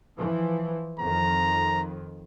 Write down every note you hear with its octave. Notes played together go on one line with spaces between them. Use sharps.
E3 F3
F2 D#3 A#5